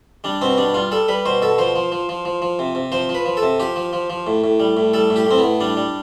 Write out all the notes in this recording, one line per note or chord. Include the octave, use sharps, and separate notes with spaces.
G3 D4
B2 C4
G3 D4
G3 F4
G3 A4
G3 B4
B2 C5
B2 A4
F3 C5
F3
F3
F3
F3
F3
C3
C3
F3 C5
F3
B4
F3
A4
C3
F3 G4
F3
F3
F3
A2
A2
G3
A2
G3 A4
A2
G4
A2 C4
B3
A2
G3 D4
G3